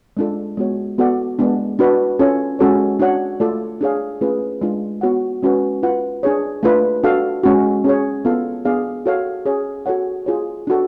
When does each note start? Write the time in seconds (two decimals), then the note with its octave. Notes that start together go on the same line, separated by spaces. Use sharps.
0.17 G#3 D4 F4 A4
0.57 G#3 B3 F#4 C#5
0.98 B3 F#4 A4 D5 F#5
1.39 G#3 B3 D4
1.79 D4 F#4 B4
2.19 C#4 F4 A4 C#5
2.59 G#3 C#4 F#4 A4 C#5
2.99 D4 F#4 C#5 F#5
3.40 A3 F4 A4 D5
3.81 D4 G#4 C#5 F5
4.21 A3 C#4 F4 G#4 B4
4.61 G#3 D4 F4
5.01 B3 F#4 C#5 F#5
5.42 G#3 C#4 F#4 B4
5.83 F4 B4 F#5
6.23 D4 G#4 C#5
6.63 A3 D4 F4 B4
7.03 D4 F#4 A4 F5
7.43 G#3 C#4 F#4
7.85 C#4 G#4 C#5
8.25 B3 F4 A4 F5
8.65 B3 D4 G#4 D5 F5
9.06 F#4 A4 C#5 F5
9.46 C#4 G#4 C#5
9.86 F#4 A4 C#5 F#5
10.26 F4 G#4 C#5
10.67 D4 F#4 A4